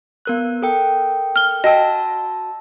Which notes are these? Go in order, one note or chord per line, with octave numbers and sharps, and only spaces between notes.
B3 A#4 F#6
A4 A#4 G5
F6 G7
F#4 D#5 G5 A5 E6